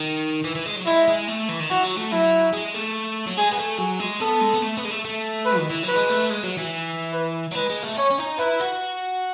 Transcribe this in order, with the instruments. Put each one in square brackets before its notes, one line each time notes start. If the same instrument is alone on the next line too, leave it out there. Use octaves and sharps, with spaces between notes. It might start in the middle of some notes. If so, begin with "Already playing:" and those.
Already playing: [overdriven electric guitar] D#3
E3
E3
G#3
F#3
[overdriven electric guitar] G#3 [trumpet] E4
[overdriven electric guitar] G#3
A3
E3
D#3
[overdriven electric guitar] E3 [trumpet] F#4
[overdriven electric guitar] F#3
A3
[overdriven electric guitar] F#3 [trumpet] E4
[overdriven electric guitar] G#3
A3
F#3
[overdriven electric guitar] G#3 [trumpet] G#4
[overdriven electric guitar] B3
A3
[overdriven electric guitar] F#3 [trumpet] G#4
[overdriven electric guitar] G#3
[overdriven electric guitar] B3 [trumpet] A4
[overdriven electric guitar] G#3
B3
A3
B3
G#3
A3
A3
[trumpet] B4
[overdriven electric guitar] D#3
E3
[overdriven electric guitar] F#3 [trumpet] B4
[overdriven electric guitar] G#3
A3
G#3
F#3
E3
[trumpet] B4
[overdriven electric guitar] F#3
[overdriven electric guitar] G#3 [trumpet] B4
[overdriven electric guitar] G#3
A3
[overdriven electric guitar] C#4 [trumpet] C#5
[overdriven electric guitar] C#4
D#4
[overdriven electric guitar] E4 [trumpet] B4
[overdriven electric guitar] F#4